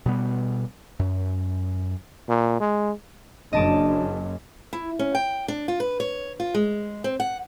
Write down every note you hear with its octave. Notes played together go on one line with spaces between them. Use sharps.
B2 G3 B3
F#2
A#2
G#3
F#1 F#2 D4 D#5 A5 D6
E4
C#4
G5
D4
F4
B4
C#5
F4
G#3
C4
F#5